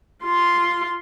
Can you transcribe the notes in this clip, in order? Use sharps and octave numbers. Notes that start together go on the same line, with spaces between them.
F4 C6